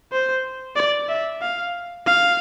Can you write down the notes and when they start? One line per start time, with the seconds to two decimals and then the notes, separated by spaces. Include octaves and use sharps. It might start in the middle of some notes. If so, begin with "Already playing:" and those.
0.12 C5
0.76 D5
1.09 E5
1.41 F5
2.06 F5